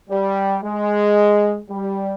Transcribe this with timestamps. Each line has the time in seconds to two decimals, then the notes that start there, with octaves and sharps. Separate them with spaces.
0.10 G3
0.63 G#3
1.70 G3